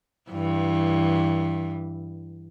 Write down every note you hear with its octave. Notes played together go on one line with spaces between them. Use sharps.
G2 E3